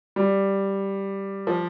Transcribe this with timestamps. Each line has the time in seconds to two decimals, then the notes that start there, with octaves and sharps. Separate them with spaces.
0.16 G3
1.47 F3